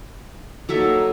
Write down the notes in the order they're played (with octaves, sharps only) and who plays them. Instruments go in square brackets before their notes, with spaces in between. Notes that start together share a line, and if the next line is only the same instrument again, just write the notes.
[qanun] F#3 A4 E5 [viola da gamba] A#3 D#4